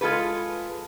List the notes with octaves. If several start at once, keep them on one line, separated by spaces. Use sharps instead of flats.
G#3 F4 A4 B4